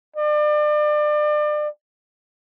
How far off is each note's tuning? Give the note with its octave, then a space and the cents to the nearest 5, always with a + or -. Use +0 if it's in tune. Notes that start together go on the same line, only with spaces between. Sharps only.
D5 +35